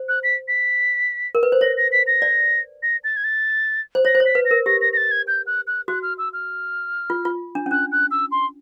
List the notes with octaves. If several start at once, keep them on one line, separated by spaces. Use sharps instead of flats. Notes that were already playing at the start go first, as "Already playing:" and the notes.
Already playing: C5
F#6
B6
B6
A#4
B4
C5
C#5 A#6
A#6
B6
A#6
D5
A#6
A6
G#6
A6
C5
C#5 A#6
C5
C#5
B6
B4
A#6
A#4
G4 A#6
A#6
A#6
A6
G#6
G6
F#6
F#6
F#4 F#6
F6
E6
F6
F4
F4
D4
C#4
D4 F#6
F#6
E6
C6